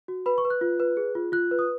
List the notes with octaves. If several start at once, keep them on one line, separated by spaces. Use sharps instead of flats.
F#4
B4 B5
C#6
B4
F#6
F4
B4
G#4
F4
F4 F#6
B4
D#6